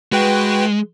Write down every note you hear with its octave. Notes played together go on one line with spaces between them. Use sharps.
G#3 F#4 B4 G5